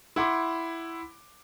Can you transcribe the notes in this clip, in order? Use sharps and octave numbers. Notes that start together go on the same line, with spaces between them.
E4 F#5 C6 D6